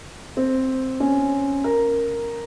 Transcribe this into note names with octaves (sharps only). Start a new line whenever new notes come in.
C4
C#4
A#4